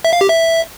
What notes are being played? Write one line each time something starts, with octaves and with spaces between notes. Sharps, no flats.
E5
F5
G4
E5